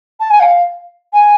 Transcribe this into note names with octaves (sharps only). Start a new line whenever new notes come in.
A5
G#5
F5
G#5